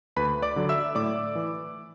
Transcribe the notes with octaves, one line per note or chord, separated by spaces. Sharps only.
D2 B4 B5
D5 D6
D3 F#3
E5 E6
A2 D5 D6
E3